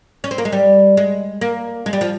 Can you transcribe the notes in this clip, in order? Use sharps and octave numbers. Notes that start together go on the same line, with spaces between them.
C#4
C4
A#3
G#3
G3
G#3
A#3
G#3
G3
F3